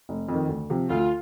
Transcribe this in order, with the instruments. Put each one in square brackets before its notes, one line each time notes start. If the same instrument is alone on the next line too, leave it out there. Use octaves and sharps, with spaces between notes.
[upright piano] F1
F2
D#3
D2
C3 F3
[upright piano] D2 [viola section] F4